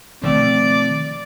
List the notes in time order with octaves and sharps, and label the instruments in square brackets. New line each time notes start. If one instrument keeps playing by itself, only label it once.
[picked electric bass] B2 D#3 C4 [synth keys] F3 A3 [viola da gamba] D5